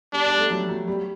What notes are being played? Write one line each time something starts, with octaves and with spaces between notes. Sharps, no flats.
G3 D4
G3
A3
F#3
F#3
G3